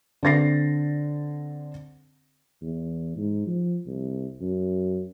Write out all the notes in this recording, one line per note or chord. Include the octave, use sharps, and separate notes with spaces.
D3 C4 A6 A#6 C7
E2
G#2
F3
C2
F#2